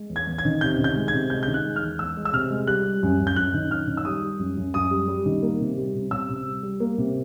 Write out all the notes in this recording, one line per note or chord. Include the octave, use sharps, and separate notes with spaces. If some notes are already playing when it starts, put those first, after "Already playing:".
Already playing: G#3
E2
G#6
E2
G#6
D#3
C3 G6
D#3
G6
G#3
G#6
C3
G#3 G6
D#3 G6
F#6
G#3
F6
E2
E2 E6
G#3
E6
C3 F6
G#3
G3 F#6
G3
F#2
F#2
G6
F#2 F#6
D#3
F#2 F6
D#3
E6
G3 D#6
G3
F#2
F#2
F#2 D#6
G3
G3
D#3
A#3
C3
G3
C3
C3 E6
C3
G3
G3
A#3
C3